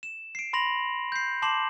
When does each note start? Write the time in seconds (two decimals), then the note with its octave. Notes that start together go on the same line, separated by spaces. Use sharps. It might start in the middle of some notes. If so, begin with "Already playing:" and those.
0.03 E7
0.35 C7 D7
0.53 B5 C6 A#6 F7 F#7
1.12 G6 C7
1.42 A5 C6 D6 C7 E7 F#7